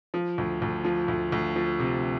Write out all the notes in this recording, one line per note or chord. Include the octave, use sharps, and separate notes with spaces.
F3
D2
D2
F3
D2
D2
F3
C3